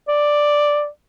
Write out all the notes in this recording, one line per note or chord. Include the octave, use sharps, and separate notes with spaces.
D5